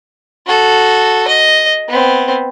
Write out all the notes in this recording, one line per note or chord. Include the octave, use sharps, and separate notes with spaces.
F#4 A4
D#5
B3 C4